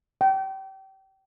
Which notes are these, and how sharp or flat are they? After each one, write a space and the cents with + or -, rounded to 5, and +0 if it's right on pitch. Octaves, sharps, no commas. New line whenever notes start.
G5 -30